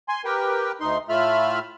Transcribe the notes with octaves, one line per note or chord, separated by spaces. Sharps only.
G#5 C6
G4 A#4 B4 G5
D2 D#4 C6
A2 A3 F4 E5 B5 F6